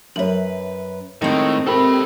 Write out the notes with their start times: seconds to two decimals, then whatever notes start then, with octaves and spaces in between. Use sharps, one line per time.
0.16 F#2 B4 C#5 E5 F#7
1.22 A2 D#3 G#3 C4
1.67 C3 A4 A#4 G5 A5 B5